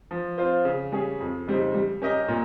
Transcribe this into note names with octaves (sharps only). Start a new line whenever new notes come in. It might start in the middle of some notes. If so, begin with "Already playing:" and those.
F3
C4 F4 C5
C#3
G3 C#4 G#4
F2
C#3 G3 C4 D#4
G3
C#4 G4 A#4 D#5
A#2